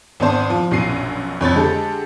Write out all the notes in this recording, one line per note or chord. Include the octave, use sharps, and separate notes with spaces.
G#1 B3 D4 C5 A5 D6
F3
A#1 F#2 B2 C7 D#7
F2 C#5 B5 A6
D3 G#3 G4 A4